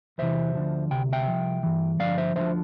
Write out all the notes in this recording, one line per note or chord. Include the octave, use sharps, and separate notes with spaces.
E2 C3 E3 C5 E5
D2 D3 F3
D2 C3 G5
E5 G5
C2 A#2 F3
G2 E3
G2 D3 F3 D5 F5
C5 E5
D2 D3 F3 C5 E5